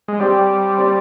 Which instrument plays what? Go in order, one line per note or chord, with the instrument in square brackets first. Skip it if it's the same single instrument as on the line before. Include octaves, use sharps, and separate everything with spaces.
[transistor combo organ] G#3
[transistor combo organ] G3 [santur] C4 G4 D5
[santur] C4 G4 D5